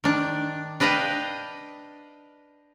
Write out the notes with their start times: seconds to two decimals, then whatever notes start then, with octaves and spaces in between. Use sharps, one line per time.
0.04 D#3 D4
0.80 D4 B4 D#5 F5 G5